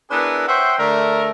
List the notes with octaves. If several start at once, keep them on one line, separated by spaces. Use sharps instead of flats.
B3 D4 E4 G#4 A#4 B4
C5 C#5 E5 F#5 G5 C6
D3 A3 A#4